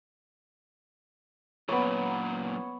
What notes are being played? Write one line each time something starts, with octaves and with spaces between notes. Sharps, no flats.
F#2 A#2 B3 C#5